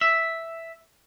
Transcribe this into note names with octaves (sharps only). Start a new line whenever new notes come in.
E5